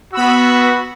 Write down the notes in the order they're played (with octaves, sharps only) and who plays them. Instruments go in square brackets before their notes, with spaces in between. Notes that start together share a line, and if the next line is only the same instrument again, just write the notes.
[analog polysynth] B3 B5 E6 [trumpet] F#4